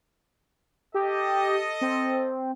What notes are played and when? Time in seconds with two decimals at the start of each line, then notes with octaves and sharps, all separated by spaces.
0.94 G4 A4 D#5
1.81 C4